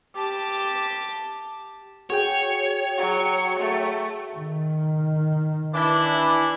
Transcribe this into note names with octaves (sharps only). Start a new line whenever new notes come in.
G4 A5
F#4 G#4 C#5 G5
F#3
A3
D#3
E3 D4 E4